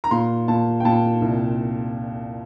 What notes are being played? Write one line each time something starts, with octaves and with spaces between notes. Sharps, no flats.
A#5
A#2 C6
A#2 A5
G5
A#2 A5
C2